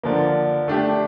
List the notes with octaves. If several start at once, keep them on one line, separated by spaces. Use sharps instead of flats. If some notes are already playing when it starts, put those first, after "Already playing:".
D3 F3 A#3
A3 D4 G4